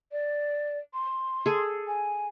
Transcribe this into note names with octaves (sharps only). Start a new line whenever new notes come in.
D5
C6
G#4 A4
G#5